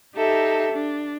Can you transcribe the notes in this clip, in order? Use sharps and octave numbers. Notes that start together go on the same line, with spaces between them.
D#4 G4 A4 E5
D4